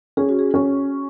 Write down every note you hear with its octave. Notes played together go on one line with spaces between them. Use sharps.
C#4 G#4
F#4
G#4
C#4